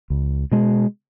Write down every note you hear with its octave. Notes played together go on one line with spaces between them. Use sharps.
C#2
B2 G#3